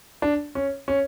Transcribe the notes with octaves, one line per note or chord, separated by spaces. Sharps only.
D4
C#4
C#4